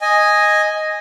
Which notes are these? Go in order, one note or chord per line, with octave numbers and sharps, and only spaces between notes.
D#5 G#5